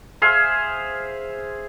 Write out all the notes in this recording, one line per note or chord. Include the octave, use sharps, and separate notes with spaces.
G#4 C5 E5 F5